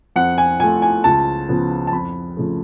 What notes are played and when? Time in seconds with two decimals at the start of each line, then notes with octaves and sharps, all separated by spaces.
0.16 F2 F#5
0.38 G#5
0.60 F3 A3 G#5
0.82 G#5
1.04 C#2 A5
1.49 C#3 F3 B3
1.87 A5
1.92 F2 B5
2.37 C#3 F3 A3